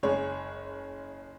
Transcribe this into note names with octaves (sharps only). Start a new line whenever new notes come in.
F#1 G#3 G#4 C#5